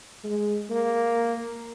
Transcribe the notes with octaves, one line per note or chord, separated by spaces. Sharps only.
G#3
A#3